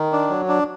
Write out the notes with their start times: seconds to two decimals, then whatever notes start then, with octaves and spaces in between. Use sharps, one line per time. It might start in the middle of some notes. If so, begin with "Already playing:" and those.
Already playing: D#3
0.13 D4
0.30 F#3
0.48 D4